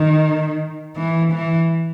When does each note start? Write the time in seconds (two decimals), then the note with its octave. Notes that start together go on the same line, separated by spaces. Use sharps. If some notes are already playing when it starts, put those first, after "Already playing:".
Already playing: D#3
0.96 E3
1.32 E3